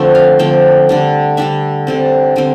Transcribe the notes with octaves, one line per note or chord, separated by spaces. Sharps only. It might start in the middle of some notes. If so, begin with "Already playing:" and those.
Already playing: D3 F3 A3 C4
F5
D3 F3 A3 C4 G5
D3 G3 D4
D3 G3 D4 E5
D3 G3 C4
D3 G3 C4